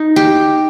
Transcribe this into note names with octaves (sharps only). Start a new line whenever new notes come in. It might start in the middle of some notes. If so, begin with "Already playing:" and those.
Already playing: D#4
G4